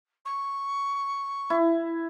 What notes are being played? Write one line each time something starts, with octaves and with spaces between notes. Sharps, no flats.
C#6
E4